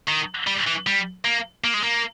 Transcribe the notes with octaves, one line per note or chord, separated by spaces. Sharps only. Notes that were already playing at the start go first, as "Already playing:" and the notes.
D#3
G3
E3
G3
A#3
A#3
G#3
A#3